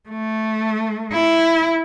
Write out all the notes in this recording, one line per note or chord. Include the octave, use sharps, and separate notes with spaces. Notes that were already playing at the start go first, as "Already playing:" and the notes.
A3
E4